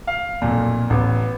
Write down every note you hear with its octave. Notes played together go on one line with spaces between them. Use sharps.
F5
B1 F2 A#2
A1 B3